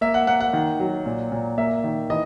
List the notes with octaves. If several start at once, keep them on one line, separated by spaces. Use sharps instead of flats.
A#3 E5
F#5
A#3 F#5
F#5
D#3
F#3
A#2
A#2
A#3 E5
D#3
E3 D#5